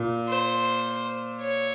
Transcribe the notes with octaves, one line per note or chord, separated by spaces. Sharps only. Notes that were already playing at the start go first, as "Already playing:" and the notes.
Already playing: A#2
C5
C#5